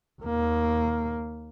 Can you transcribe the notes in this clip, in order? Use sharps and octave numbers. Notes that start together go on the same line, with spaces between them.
D#2 A#3